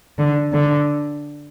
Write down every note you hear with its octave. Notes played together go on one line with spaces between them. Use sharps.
D3
D3